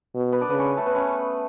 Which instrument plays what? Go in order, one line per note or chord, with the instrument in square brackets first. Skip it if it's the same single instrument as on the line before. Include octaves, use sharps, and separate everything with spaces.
[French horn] B2
[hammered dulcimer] B3 B4
D4 D5
[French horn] C#3 [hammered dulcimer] B3 B4
[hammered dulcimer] C#4 C#5
A3 A4
B3 B4
C#4 C#5